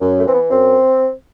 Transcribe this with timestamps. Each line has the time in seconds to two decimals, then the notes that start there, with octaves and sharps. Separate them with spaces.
0.01 F#2
0.18 A3
0.26 E3 C4
0.34 B3
0.51 F#2 C4